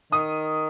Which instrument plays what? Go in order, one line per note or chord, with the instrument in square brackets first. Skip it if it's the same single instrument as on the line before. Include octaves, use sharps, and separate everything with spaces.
[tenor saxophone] D#3 [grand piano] D#6